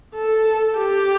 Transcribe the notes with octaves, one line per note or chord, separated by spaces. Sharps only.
A4
G4